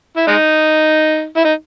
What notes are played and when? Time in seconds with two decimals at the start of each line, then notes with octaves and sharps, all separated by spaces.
0.17 E4
0.27 G#3 D#4
1.37 E4
1.44 D#4